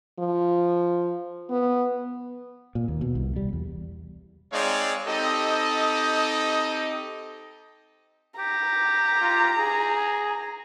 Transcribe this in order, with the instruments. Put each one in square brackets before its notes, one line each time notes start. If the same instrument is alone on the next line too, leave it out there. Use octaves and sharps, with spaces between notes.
[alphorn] F3
B3
[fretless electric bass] A#2
D#2
B2
C2
G3
E2
[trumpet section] G#3 C4 D#4 C#5 D5 F5
C4 D#4 G4 A4 D#5
[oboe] G4 [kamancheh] A#5
[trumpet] F4
G#4